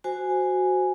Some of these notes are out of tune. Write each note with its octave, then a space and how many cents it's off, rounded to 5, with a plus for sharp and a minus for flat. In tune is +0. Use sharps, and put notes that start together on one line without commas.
F#4 +0 C5 -10 G#5 +0